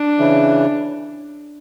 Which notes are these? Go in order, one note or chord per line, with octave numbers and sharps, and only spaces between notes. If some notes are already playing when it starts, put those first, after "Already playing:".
Already playing: D4
C#3 E3